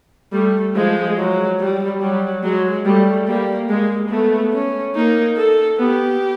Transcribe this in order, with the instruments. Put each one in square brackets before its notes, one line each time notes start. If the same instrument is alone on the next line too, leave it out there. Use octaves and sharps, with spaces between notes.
[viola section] G3 [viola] A3
[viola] F3 [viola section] G#3
[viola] F#3
G3
[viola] F#3 [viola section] G3
[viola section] F#3 [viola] G#3
[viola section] G3 [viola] A3
[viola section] G3 [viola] A#3
[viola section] G#3 [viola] A#3
[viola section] A3 [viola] B3
[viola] C#4
[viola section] A#3 [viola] D#4
[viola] A4
[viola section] B3 [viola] G4